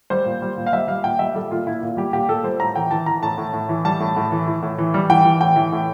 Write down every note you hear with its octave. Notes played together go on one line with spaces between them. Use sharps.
G3 C5
A#2
G3
A#2
F5
G3 E5
G3 F5
A#2 G5
G3 E5
G3 A4
A#2 F4
A#2 E4
A#2
G3 G4
A#2 G4
A#2 A4
G3 C5
A2 A#5
E3 G5
E3 A5
E3 A#5
A2 A5
A2
A2
E3
G3 A5
A2
A2
E3
E3
A2
E3
G3
E3 G5
E3
A2 G5
E3
A2